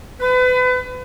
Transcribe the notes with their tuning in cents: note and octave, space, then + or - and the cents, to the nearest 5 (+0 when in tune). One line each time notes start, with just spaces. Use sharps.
B4 +35